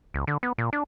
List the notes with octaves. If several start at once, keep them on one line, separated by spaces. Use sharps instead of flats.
C#2
D3
B3
A#2
D4